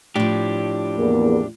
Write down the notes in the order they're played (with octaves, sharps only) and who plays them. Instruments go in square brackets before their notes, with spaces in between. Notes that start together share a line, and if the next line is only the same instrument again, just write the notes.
[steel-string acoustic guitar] A2 F3 [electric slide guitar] D4 G4
[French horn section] E2 A#3